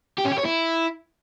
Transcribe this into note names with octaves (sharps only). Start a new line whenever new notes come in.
G4
C#4
G4
C#5
E4